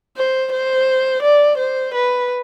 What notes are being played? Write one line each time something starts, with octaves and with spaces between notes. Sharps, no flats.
C5
C5
D5
C5
B4